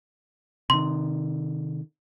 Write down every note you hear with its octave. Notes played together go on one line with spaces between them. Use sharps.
C3 D#3 C6